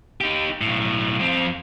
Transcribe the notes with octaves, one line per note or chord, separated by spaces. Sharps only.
D#4 G4
B1 A2
F2 C4